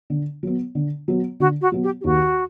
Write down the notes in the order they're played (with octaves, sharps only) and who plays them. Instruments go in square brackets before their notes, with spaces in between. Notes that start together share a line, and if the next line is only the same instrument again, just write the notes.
[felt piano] D3
F#3 B3
D3
F#3 B3
[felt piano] D3 [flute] F#4
[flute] F#4
[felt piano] F#3 B3
[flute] G4
G4
[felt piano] D#2 [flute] F#4